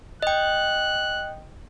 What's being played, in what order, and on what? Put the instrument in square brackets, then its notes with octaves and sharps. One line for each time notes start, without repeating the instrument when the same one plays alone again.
[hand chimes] D#5 G5 [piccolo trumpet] F#6